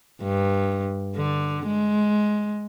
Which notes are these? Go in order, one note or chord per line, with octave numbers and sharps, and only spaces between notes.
G2
D3
G#3